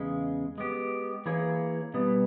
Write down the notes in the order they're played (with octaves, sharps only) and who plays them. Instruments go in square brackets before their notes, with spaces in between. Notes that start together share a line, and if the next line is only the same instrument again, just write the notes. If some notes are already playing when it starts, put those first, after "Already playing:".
Already playing: [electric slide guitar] E2 C#3 G#3
G#3 B3 G4
E3 A#3 E4 G#4 C#5
B2 G3 B3